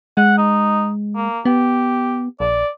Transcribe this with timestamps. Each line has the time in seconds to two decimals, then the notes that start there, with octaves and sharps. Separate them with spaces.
0.17 G#3 F#5
0.38 D#4
1.16 A#3
1.45 B3 G4
2.40 A#1 D5